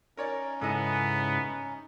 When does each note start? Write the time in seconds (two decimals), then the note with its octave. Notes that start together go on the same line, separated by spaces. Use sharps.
0.17 C#4 D#4 A#4 C#5 D5
0.61 G#2 C#3 B3 E4 A4 D#5 G#5